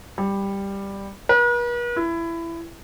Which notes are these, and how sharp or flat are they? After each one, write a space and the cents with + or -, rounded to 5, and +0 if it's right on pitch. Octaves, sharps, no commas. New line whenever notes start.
G3 +10
B4 -45
E4 +20